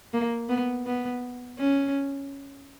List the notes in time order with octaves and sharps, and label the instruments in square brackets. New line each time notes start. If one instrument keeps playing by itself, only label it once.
[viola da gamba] A#3
B3
B3
C#4